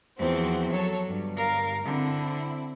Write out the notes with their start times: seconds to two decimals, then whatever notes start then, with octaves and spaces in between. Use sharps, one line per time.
0.18 E2 F3 C4 F#4
0.70 F#3 A4 C#5
1.06 G1 G2
1.37 A#4 F5
1.85 D3 C4 E4